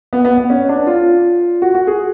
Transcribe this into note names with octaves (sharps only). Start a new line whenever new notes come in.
B3
B3
B3
C#4
D4
F4
F#4
F#4
G#4